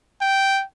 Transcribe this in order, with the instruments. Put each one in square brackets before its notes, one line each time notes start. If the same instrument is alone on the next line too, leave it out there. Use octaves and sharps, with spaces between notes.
[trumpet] G5